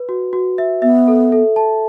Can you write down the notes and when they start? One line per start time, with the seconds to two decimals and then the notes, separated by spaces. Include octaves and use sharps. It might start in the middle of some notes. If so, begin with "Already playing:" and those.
Already playing: B4
0.09 F#4
0.33 F#4
0.58 E5
0.82 B3 E5
1.08 A4
1.32 A4
1.56 A5